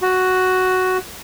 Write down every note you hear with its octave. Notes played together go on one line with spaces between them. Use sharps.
F#4